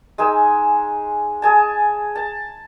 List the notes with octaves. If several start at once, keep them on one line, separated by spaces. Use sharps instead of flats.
G#3 D#4 G#5 E6
G#4 G#5 A5
A5